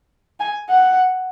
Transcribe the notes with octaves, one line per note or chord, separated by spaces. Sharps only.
G#5
F#5